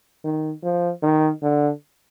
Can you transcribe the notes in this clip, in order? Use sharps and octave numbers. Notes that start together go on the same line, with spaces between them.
D#3
F3
D#3
D3